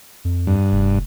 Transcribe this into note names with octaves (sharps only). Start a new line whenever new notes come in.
F2
G2
F1